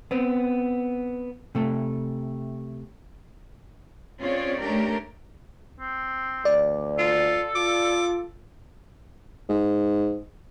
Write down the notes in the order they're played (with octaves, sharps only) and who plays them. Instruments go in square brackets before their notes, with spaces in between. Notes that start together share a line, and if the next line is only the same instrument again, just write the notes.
[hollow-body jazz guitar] B3 C4
C3 A3
[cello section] C4 C#4 F4 G#4 C#5 D5
A3 C#4 D4 G4 A#4
[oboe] C4
[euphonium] D2 [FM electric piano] D5
[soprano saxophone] F4 [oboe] A4
[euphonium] F4 [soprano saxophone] D6
[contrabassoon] G#2